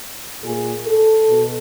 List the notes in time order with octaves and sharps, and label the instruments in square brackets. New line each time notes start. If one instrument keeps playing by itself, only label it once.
[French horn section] A#2 G#4
A4
B2